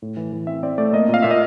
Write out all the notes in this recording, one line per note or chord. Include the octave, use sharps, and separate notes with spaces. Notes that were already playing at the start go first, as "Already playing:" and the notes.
A2
E3
E3
C4 E5
C4 D5
A3 D5
A#3 D#5
A#2
F5
A#2 E5
D#5